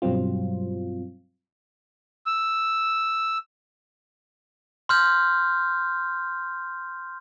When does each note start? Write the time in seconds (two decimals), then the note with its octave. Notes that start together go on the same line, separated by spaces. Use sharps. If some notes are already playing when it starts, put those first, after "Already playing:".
0.02 G2 B2 F#3 G3 C4 F4
2.26 E6
4.89 C6 F6 G6